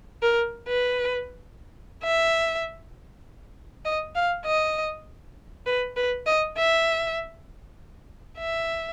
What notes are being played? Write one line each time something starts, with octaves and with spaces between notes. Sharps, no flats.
A#4
B4
E5
D#5
F5
D#5
B4
B4
D#5
E5
E5